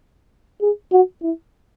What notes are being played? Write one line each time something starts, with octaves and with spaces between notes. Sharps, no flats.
G#4
F#4
E4